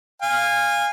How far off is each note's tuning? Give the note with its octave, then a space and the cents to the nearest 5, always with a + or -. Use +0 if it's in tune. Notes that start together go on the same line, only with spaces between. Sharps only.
F5 +0 G#5 -25